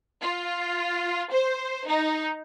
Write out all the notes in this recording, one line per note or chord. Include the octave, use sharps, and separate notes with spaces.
F4
C5
D#4